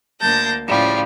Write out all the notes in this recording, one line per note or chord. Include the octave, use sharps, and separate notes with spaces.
D2 A#3 A5 G6 A#6
A2 C#3 F3 G3 F4